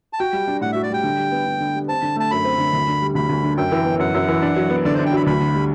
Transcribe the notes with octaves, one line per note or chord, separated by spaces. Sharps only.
A5
F#4 G5
G3
D4
A2 F#5
F#4 E5
D5
G3 G5
D3
G3
B3
D3
D3
G3
C4 A5
D3
A3 A5
F#2 B5
C4
D3
D2
D3
G3
D2 B5
D2
D3
F#2 G5
E3
B3
F#2 F#5
F#2
E3
D4
F#3
B3
D3 D5
D4 C5
G5
F#3 B5
D2 B5
D3
G3